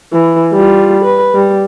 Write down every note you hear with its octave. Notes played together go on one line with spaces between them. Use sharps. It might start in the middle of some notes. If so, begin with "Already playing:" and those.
E3
G3 F4
B4
G3